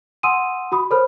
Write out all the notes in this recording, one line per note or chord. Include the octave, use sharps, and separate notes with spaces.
F#5 G#5 C6 D#6 E6 D#7
F#4 B5 D#6
A4 A#4 C5 C#5 B5 F6